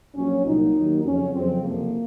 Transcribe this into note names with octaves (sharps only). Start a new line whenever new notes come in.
A#1 A#2 F#3 C#4
C2 A#2 F#3 D#4
D#2 D#3 F#3
F2 C#3 F#3 C#4
F2 C#3 F#3 C4
F#1 F2 C3 F3 A#3